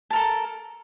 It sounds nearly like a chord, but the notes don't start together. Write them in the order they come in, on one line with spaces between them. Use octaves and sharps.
A5 A#4 A4